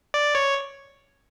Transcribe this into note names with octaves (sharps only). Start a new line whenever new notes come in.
D5
C#5